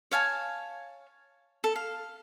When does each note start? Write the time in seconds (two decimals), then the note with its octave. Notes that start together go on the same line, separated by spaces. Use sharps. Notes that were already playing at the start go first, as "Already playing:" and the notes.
0.11 C#5 F5 G#5 A5
1.64 A4
1.76 F5